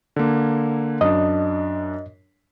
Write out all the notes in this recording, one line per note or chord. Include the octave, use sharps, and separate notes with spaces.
D3 A#3
F#2 D4 D#5